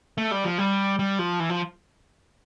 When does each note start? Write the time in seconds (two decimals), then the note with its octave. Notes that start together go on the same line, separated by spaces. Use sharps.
0.18 A3
0.31 G3
0.44 F3
0.58 G3
0.99 G3
1.19 F3
1.40 E3
1.50 F3